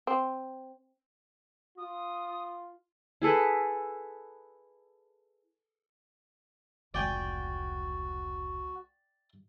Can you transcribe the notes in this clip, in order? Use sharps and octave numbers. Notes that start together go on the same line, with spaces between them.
C4
F4 D#6
E4 G#4 A4 B4
F1 C#2 G#3 F#4 D5 G5 G#5